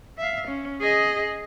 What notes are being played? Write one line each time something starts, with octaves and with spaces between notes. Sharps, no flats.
E5 F5
C#4
G#4 D#5